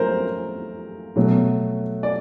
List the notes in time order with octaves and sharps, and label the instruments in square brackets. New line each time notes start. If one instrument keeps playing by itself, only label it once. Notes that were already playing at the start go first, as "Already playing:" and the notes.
Already playing: [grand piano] F#3 A3 A#4 C5
B2 F#3 A3
D5